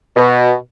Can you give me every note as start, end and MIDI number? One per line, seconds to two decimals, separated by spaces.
0.16 0.53 47